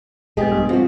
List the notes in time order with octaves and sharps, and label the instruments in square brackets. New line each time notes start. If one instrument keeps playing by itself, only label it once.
[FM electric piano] A#1 B2 [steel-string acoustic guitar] G#3 G4 G#4
[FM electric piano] G2
[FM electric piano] C3 [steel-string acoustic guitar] F3 F#4